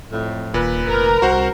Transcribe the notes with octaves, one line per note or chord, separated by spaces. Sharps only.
F2 A2
D#1 A#2 B4
F1 A#4
C2 F#4 C5 F#5